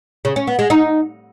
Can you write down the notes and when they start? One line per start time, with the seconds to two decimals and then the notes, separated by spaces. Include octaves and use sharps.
0.25 C#3
0.36 C#4
0.47 B3
0.59 G#3
0.70 D#4